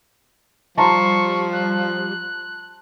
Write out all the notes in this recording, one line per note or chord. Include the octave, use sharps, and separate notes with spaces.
F3 G3 A5 A#5 C6 C#6
F#6